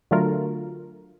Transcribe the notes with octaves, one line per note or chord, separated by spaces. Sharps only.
D3 F#3 A3 F4 A#4